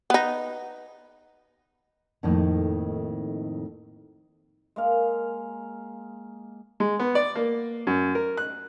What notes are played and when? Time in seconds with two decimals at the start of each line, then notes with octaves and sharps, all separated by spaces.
0.10 B3 D#4
2.23 F2 A2 D#3 A3 A#3 D#4
4.76 G#3 A#3 F5
6.80 G#3
6.99 B3
7.15 D5
7.35 A#3
7.87 F#2
8.15 A#4
8.37 F#6